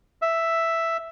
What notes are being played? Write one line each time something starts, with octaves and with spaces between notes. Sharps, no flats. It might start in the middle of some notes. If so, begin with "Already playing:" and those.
E5